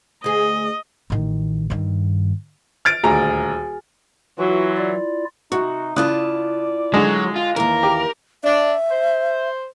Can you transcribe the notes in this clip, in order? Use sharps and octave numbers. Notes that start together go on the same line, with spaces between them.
D2 G#4 D#5
A1 D#3
G2 D#3
F6 A6 D7
D#1 D2 F#4 G#4 G#5 A#5
E3 F#3 F4 F#4
E4 F4 D5
C3 D#4 F#4
C#3 E4 F4 D5 A5 D#6 F#6
D3 F#3 G#3
F4
D#2 E3 A#3 A#4
G4
D4 E5
C5